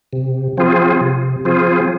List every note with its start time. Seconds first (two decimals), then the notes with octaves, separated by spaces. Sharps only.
0.13 C3
0.57 F3 C4 F4 G#4
1.01 C3
1.45 F3 C4 F4 G#4